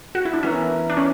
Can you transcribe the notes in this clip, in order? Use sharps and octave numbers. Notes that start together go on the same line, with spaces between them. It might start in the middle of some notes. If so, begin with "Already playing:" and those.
F#4
E4
D4
E3 B3 C#4 E4 A#4
D4
C#4